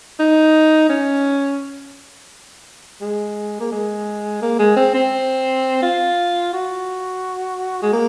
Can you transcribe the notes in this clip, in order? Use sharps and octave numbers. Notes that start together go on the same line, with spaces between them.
D#4
C#4
G#3
A#3
G#3
A#3
G#3
C4
C4
F4
F#4
G#3
A#3